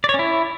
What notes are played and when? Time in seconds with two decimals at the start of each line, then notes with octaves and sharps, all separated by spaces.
0.04 D5
0.09 C#5
0.14 C#4
0.19 E4